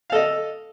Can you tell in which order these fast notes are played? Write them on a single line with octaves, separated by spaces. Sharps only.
F5 A4 D#5